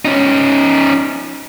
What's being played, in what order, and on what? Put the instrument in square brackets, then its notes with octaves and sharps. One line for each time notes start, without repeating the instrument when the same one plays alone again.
[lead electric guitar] C#4 D#4